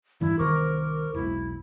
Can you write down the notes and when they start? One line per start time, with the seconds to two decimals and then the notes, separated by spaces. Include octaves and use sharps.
0.21 F1 G2 E3 G3 E4
0.39 C2 D#3 A#4 C5 C#6 D6
1.14 E1 B1 E4